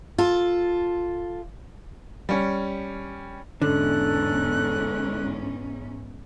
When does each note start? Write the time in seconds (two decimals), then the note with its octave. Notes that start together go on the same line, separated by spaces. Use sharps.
0.18 F4 A4
2.29 G3 C#4
3.62 E2 G#2 D3 C#4 A4 F#6